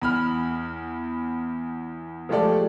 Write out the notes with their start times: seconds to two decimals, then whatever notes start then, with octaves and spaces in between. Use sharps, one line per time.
0.02 E2 B5 F6
2.29 F3 G#3 A3 G4 A4 D5